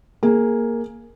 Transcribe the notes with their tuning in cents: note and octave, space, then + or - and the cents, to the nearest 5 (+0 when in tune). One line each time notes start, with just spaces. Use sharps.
A#3 +0 G#4 +0